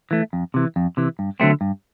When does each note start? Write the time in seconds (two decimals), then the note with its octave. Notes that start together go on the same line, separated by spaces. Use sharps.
0.11 E3 A3
0.33 F2
0.54 C3 E3
0.76 F2
0.97 C3 E3
1.19 G2
1.40 D3 F#3 A3 C4
1.61 G2